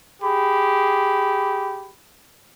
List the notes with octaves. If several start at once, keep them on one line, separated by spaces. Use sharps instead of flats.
G4 G#4 B5